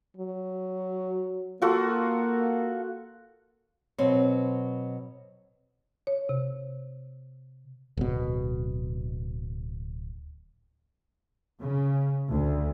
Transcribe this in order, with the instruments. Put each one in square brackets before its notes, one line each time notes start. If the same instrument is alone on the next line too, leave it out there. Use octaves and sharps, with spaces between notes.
[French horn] F#3
[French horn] A#3 [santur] F4 F#4 A4
[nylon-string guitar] B2 F#3 C4 [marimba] C#5
[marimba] C#5
C3
[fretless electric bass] D1 B2
[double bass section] C#3
D2